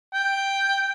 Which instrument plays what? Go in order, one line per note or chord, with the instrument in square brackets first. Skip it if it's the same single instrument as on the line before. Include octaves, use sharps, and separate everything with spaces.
[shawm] G5